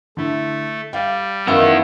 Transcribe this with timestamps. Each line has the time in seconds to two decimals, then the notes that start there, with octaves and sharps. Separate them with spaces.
0.17 D3 A3 E4
0.93 G3 F5 G5
1.47 F#2 D#3 B3 E4 F5 E6